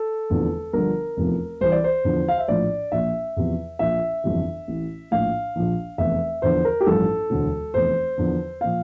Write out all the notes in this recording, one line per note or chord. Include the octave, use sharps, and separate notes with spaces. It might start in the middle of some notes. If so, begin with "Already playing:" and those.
Already playing: A4
F1 E2 D3 F3
G1 G2 D3 F3 A#4
F1 E2 C3 F3
C2 C3 E3 C5
D5
C5
E2 D3 F3
F5
E5
A#1 A2 F3 D5
A#1 A#2 F3 E5
E2 C3 F3
A#1 A#2 F3 E5
G1 F2 C3 E3
A1 A2 E3
A#1 A2 F3 F5
A#1 A#2 F3
F1 E2 E3 E5
E2 D3 F3 C5
A#4
G4
A1 G2 F3 A4
E1 D2 D3
F1 E2 E3 C5
E2 D3 F3
A#2 F3 F5